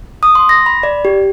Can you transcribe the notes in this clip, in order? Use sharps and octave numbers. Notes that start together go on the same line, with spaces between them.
D#6
C6
A#6
B5
D5
G4